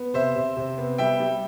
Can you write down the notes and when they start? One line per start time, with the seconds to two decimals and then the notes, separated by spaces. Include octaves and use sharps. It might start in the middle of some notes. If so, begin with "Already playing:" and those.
Already playing: B3
0.14 C3 C5 E5
0.36 C3
0.57 C3
0.78 B3
0.98 G3 E5 G5
1.20 G3